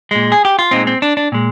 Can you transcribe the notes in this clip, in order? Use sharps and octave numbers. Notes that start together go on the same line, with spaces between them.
A#2 G#3
G#4
G4
F4
A#2 G#3 C4 D#4
C4
D4
D4
A#2 G#3